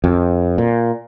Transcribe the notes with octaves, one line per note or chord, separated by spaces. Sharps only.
F2
A#2